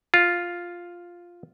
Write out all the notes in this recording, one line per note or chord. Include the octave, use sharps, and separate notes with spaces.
F4